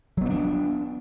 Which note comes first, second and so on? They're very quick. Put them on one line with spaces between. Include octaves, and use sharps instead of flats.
F#3 B3 C4 D4